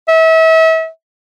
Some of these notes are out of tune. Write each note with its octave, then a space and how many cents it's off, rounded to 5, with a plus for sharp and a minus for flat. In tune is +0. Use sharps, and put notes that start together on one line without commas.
E5 -35